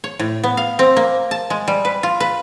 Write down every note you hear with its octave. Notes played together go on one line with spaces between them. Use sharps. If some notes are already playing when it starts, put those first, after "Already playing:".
C#5
A2
B3
F5
C4
A#3
A5
G#3
G3
B4
F4
B4